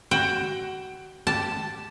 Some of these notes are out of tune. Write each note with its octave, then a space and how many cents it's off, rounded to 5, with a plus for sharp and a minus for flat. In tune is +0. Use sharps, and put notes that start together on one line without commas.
F#4 +30 G5 +20
G4 +0 A5 +0